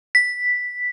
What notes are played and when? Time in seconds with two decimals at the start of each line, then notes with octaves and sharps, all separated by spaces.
0.15 B6